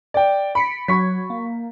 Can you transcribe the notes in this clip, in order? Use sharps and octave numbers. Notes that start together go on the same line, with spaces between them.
D5 G5
B5 B6 C#7 D7
F#3 F#4 B5 C#6 G#6 B6
A#3